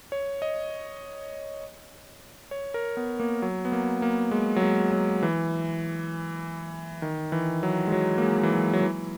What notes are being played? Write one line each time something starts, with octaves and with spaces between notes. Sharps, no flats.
C#5
D#5
C#5
A#4
B3
A#3
F#3
B3
A#3
A#3
G#3
F#3
G#3
F#3
E3
D#3
E3
F#3
G#3
F#3
A#3
G#3
E3
F#3
F#3
E3